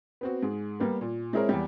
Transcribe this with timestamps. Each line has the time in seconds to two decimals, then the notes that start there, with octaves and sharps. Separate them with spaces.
0.21 B3 C4 F#4
0.43 G#2 G#4
0.80 G3 A#3 B3
1.01 A#2
1.33 G#3 C4 E4 G#4 A#4 C#5
1.49 E2 G3